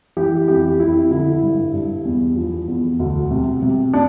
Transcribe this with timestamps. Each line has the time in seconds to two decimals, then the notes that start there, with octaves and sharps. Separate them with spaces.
0.17 E3 G4
0.48 F2 G4
0.79 F2 E4
1.11 D3 E4
1.42 G2
1.73 G2
2.05 E2
2.36 F3
2.68 E2
2.99 D2
3.31 C3
3.62 C3
3.93 D4